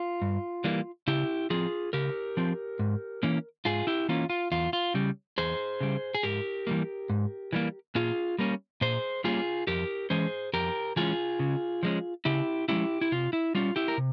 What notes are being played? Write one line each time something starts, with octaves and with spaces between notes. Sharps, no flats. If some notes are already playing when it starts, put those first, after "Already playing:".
Already playing: F4
G2
E3 G3 A#3
C#3 E4 G4
F3 C4 F4 G#4
C#3 G4 A#4
F3 C4
G#2
E3 A#3 C#4
G#2 F4 G#4
E4 G4
E3 A#3 C#4 F4
F4
E2 F4
F4
C#3 G3
E2 G#4 C5
C#3 G3
G#4
G#2 G4 A#4
E3 G3 A#3
G#2
E3 G3 A#3
A#2 F4 G#4
G3 A#3 C#4
A#2 G#4 C5
G3 A#3 C#4 F4 G#4
F2 G4 A#4
E3 G#3 C#4 G#4 C5
F2 G4 A#4
E3 G#3 C#4 F4 G#4
C#3
F3 G#3 C#4
C#3 E4 G4
F3 G#3 C#4 E4 G4
E4
C3 F4
E4
G3 C#4 F4
E4 G4
A#4
C3